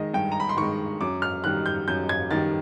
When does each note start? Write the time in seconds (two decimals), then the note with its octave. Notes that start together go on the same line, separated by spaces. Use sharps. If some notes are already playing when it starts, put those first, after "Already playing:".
Already playing: D#3 G#3 D#5
0.14 G2 G5
0.32 A#5
0.40 B5
0.49 C6
0.57 D#3 G#3 C#6
1.01 F#2 D6
1.22 F6
1.44 D#3 G3 F#6
1.66 G6
1.88 F#2 G6
2.09 G#6
2.31 D#3 G3 A6